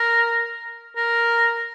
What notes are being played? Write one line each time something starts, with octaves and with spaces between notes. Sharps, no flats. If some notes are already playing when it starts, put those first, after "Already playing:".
Already playing: A#4
A#4